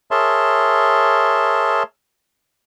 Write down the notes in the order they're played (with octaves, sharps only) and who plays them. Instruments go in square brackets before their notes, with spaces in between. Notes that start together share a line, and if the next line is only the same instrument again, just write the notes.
[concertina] G#4 A#4 C#5 E5 A5 C6